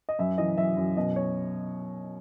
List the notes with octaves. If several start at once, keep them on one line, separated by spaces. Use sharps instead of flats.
D#5
F#2 E5
E3 D#5
F#2 E5
F#2
B2 D#5
C#5